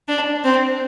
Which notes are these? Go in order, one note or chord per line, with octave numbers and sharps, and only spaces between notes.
D4
C4